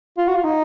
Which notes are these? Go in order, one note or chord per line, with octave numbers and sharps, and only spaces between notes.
F4
F#4
F4
D#4